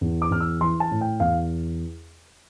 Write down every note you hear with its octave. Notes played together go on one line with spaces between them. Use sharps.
E2
D6
E2 F6
E6
E3 C6
A5
A2
G5
E2 F5